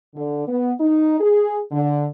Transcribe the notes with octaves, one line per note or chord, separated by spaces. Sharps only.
D3
B3
D#4
G#4
D3